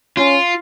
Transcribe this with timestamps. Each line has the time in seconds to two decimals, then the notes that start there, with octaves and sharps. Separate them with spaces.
0.17 C#4 F4